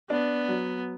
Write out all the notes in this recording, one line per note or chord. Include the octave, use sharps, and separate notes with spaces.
B3 D4
F#3